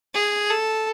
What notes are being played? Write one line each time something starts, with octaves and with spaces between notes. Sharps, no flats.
G#4
A4